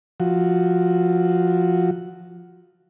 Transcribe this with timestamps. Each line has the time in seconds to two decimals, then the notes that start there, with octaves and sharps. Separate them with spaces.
0.20 F3 F#4